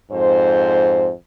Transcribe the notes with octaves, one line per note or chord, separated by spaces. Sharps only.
F2 G#2 C5